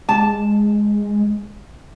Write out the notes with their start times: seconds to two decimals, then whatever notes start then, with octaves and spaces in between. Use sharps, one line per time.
0.09 G#3 A5